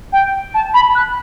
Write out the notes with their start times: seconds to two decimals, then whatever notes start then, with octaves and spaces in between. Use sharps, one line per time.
0.13 G5
0.54 A5
0.74 B5
0.95 F#6